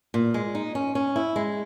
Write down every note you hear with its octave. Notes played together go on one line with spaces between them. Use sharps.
A#2
G#3
D#4
C#4
C#4
E4
G#3